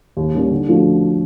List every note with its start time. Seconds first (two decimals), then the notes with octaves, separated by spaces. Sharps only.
0.17 D#2
0.34 D#3 G3 A#3 C#4
0.51 D3
0.69 F3 A3 D4 F#4